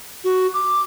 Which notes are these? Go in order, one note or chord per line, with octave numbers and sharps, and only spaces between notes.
F#4
D6